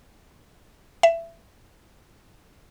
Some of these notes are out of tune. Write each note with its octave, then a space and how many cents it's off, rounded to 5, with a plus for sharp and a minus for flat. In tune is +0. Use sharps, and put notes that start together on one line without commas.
E5 +20